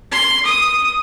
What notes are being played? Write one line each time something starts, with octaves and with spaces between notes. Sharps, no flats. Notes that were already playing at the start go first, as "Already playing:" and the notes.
C6
D#6